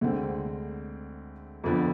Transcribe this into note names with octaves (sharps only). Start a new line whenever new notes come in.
D2 D3 G#3 C4
F2 D3 F3 B3